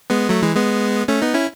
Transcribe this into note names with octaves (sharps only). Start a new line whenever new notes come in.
G#3 B3
F#3 A3
E3 G#3
G#3 B3
A3 C#4
B3 D#4
C#4 E4